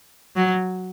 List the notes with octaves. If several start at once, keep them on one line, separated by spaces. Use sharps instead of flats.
F#3